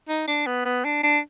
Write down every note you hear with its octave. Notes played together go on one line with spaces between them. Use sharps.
D#4
D4
B3
B3
D4
D4